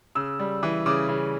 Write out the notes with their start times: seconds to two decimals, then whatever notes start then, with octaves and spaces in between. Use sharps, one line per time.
0.15 C#3 E6
0.39 G3
0.63 E3
0.86 C#3 D6
1.08 C#3